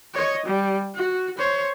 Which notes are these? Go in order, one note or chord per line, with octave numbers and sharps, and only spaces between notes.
C#5 D#5
G3
F#4
C5 C#5